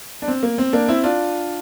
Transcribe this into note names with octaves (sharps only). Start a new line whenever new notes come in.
D4
C4
A#3
C4
A#3 D4
C4 E4
D4 F4